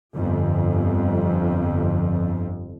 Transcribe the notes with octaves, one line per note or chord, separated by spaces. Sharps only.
G1 F2